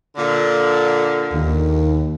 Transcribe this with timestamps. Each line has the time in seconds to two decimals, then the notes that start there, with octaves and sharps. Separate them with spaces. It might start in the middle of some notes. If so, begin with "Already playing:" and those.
0.16 A#2 D3
1.33 D#2